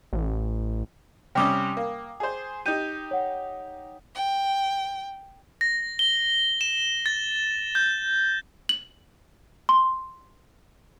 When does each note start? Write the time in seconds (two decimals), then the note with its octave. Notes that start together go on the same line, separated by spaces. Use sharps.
0.13 A1
1.35 C3 G3 C#4 G5 D6 D#6
1.77 A#3
2.20 G#4 C5
2.66 D#4 G4 G6 D#7
3.11 C#5 F#5
4.15 G5
5.61 A#6
5.99 G7
6.61 E7
7.06 A6
7.75 G6
8.69 F#7
9.69 C6